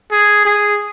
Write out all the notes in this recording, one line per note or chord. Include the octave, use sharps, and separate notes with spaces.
G#4
G#4